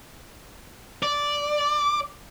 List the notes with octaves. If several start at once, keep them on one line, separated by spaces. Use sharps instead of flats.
D5